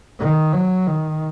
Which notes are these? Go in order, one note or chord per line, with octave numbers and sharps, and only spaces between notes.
D#3
F#3
D#3